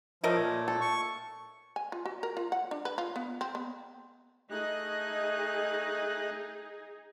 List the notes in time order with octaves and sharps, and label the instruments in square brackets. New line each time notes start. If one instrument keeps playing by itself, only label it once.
[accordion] F3 [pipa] A3 A#4 D#5 [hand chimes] F4 C#5
[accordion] A#2 [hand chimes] G#6
[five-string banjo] A4
[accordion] C#6
[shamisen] G#5
F4
F#4
A#4
F4
F#5
D4
B4
F4
B3
C4
B3
[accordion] A3 D#5 F#6 [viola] D#4 G#4